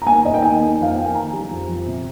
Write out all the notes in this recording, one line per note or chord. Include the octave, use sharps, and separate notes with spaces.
A#5
D#2 G#5
D#2 D#5
G5
D#3 G#5
A#3
F2 F5
A#3 G5
G#5
D#3 A#5
G3
F2
F2
C3